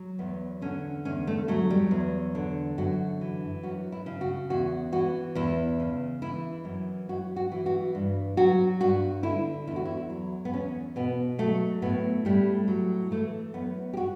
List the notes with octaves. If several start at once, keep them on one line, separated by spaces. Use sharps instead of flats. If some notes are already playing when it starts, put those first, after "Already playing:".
Already playing: F#3
E2 B3
D3 C#4
E2 C#4
A3
F#3 A3
G3
E2
D3
F#2 F#4
E3
F#2 F#4
E4
C#3
F#4
E2 F#4
E3 F#4
E2 E4
C#3
E3 E4
F#2
F#2 F#4
F#4
E3
F#4
G2
F#3 F#4
G2 F#4
D3 E4
E2 E4
F#4
E4
F#3
B3
E2 C#4
B2 B3
F#3 A3
A2 B3
A2 G3
F#3
E3 A3
F#2 B3
G4
F#4